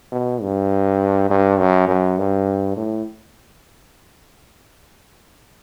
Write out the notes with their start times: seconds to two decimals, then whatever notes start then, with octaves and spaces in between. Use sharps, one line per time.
0.12 B2
0.42 G2
1.30 G2
1.59 F#2
1.88 F#2
2.18 G2
2.77 A2